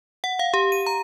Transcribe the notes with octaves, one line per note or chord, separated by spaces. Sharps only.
F#5
F5
G4
D#7
A#5